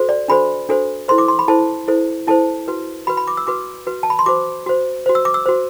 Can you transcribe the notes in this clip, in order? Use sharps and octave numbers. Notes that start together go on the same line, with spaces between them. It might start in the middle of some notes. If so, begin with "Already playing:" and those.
Already playing: F#4 A4 C5
D5
D4 F#4 A4 C5 B5
D4 F#4 A4 C5
E4 A4 C5 C6
D6
C6
B5
E4 A4 C5 A5
E4 A4 C5
E4 A4 C5 A5
F#4 B4
F#4 B4 B5
B5
D6
E6
F#4 B4 D6
F#4 B4
A5
B5
C6
F#4 C5 D6
F#4 C5
F#4 C5
E6
D6
E6
F#4 C5